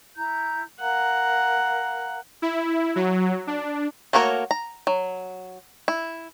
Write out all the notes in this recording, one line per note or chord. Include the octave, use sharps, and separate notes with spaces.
E4 A#5 G6
A#4 F5 F#5 A#5
E4
F#3
D4
A3 A#3 F#4 A#4 C#5
A#5
F#3
E4